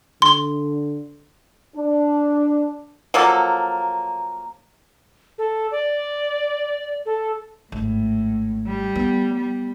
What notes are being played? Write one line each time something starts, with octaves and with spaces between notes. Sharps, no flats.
D3 C6
D4
F3 F#3 A#3 A4
A4
D5
A4
G#1 A2
G3
B3
G3